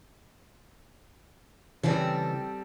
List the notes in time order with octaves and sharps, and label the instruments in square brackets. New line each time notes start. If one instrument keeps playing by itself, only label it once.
[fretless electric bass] C#3 E3 [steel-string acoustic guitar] G3 C4 A4